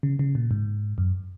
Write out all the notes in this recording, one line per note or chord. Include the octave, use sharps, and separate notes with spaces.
C#3
C#3
A#2
G#2
F#2